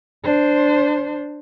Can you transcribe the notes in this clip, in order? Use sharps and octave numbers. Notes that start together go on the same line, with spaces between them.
D4 C5